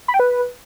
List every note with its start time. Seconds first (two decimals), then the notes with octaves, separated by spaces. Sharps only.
0.08 B5
0.14 G5
0.20 B4